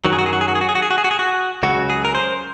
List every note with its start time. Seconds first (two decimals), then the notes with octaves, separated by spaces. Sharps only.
0.05 F#2 D#3 F#3 F#4
0.13 G#4
0.19 F#4
0.26 G#4
0.33 F#4
0.41 G#4
0.48 F#4
0.55 G#4
0.61 F#4
0.69 G#4
0.75 F#4
0.82 G#4
0.91 F#4
0.98 G#4
1.04 F#4
1.11 G#4
1.19 F#4
1.63 C#2 C#3 F#3 F#4
1.90 G#4
2.05 A#4
2.15 C5